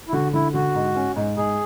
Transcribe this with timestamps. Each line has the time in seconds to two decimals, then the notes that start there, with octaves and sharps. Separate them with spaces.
0.08 E4
0.13 D3 F#4
0.33 D3 E4
0.54 D3 F#4
0.75 G#2
0.96 C#4
1.16 G#2
1.37 G#2 G#4